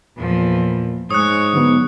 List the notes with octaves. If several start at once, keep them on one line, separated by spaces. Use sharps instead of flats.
E2 A#2 F3
G#2 G#3 C#5 D#6 F#6
D3 F#3 B3